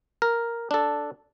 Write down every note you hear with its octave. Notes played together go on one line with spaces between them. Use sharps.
A#4
D4 A4